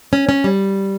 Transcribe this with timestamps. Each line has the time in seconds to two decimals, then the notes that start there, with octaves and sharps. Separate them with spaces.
0.13 C#4
0.29 C#4
0.44 G3